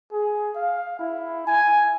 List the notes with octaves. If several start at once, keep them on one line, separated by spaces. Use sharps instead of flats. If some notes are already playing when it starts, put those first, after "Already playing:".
G#4
F5
E4
G#5